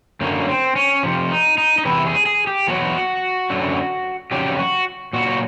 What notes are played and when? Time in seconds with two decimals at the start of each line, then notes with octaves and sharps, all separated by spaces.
0.21 F#2 D3 F#3 A#3
0.48 C4
0.76 C#4
1.03 F2 C3 F3
1.30 D#4
1.58 D#4
1.78 D#4
1.85 E2 C3 E3 E4
2.06 G#4
2.26 G#4
2.47 G4
2.68 E2 B2 F#3 F#4
3.50 F#2 D3 F#3
4.31 F2 C#3 F#3 G4
4.59 F#4
5.13 A#2 F#3 F#4